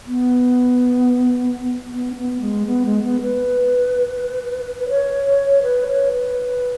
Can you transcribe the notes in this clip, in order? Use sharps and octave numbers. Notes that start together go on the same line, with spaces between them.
B3
B3
C#4
B3
G#3
B3
G#3
B3
B4
B4
C#5
C#5
B4
C#5
B4